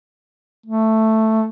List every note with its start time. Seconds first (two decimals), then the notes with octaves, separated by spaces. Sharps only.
0.66 A3